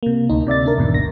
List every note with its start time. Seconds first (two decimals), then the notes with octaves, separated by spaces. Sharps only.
0.03 C3 A#3
0.29 D2 D#4
0.47 C3 D5 E5 A6
0.66 D4 A#4
0.78 E2 G#2 B2 D3 D#3
0.94 G#1 D#2 A#6